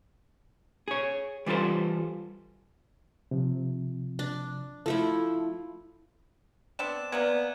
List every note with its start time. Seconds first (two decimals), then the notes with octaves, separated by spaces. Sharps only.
0.88 G#4 C#5
1.46 E3 G3 F4 A4 C5
3.31 C3 F3
4.19 D4
4.86 F3 A3 E4 A4
6.79 B3 C4 D4 E7
7.12 C3 G#3 A#3 B3 D5 G#6